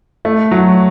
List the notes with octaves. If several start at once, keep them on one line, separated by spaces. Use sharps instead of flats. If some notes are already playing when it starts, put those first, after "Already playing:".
A3
F#3